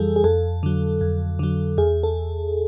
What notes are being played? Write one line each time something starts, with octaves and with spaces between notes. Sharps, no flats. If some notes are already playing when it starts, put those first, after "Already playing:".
Already playing: F2 E3 G3 G#4 A4
G#4
F2 A4
D3 F#3
F2
D3 F#3
E2 G#4
A4